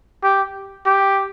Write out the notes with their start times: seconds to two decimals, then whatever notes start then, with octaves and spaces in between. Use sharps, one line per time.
0.23 G4
0.86 G4